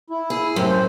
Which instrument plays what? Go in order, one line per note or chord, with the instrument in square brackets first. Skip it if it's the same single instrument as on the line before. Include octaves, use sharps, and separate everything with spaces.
[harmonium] E4
[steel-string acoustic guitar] G#4
[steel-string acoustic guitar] F#2 [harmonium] A2 C3 C4
[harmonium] C5